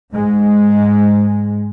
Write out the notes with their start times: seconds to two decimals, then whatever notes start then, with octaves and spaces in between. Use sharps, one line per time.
0.13 G#2 G#3